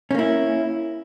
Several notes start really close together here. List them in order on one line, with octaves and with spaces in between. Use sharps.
C#4 A#3 E4